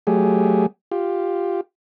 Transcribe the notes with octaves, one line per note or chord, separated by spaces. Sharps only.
F#3 A3 G4 G#4
F4 G4